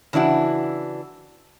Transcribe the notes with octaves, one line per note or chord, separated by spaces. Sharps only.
C#3 E3 D4 E4 F#4